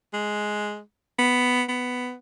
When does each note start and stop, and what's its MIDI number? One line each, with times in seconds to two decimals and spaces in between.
0.14 0.80 56
1.19 1.63 59
1.69 2.14 59